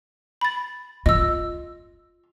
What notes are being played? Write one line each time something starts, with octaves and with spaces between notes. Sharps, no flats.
B5 A6
F4 D#5 E6